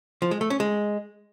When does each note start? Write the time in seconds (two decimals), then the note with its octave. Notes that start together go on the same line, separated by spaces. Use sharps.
0.22 F3
0.31 G#3
0.41 A3
0.50 C#4
0.60 G#3